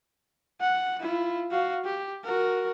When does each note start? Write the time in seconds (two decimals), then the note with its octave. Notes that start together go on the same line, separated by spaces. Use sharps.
0.61 F#5
1.00 E4 F4
1.51 F#4 F5
1.85 G4
2.24 F#4 A#4